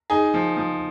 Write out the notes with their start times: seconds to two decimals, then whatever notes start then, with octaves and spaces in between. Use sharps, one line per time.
0.10 D#4 G#4
0.34 F3
0.57 F3